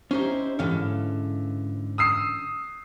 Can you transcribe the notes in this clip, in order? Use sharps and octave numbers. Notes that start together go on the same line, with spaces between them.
C#4 D#4 E4 G4 C5
F2 G#2 D3 E3 C#4 F5
D#6 E6 C7